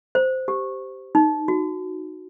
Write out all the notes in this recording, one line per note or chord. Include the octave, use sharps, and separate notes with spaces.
C5
G4
D#4
F#4